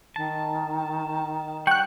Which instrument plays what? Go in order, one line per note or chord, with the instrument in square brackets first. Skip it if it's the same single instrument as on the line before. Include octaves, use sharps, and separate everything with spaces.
[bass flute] D#3 [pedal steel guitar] A5
[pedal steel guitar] G3 F#5 C#6 [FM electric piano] G5 F#6